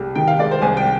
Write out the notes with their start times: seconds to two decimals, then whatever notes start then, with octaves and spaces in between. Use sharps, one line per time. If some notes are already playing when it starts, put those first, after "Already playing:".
Already playing: C2 G3
0.15 D#3 G5
0.28 F5
0.39 G#3 D5
0.51 C5
0.62 C2 G#5
0.77 G5